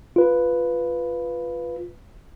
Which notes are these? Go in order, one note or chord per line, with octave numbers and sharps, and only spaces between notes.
F4 B4